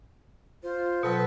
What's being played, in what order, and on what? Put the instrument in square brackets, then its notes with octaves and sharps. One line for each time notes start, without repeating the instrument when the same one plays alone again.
[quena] F4 [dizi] C5
[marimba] B2 F#3 [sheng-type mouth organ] A4 B4